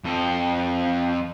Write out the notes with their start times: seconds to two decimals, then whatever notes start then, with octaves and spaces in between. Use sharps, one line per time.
0.04 F2 A4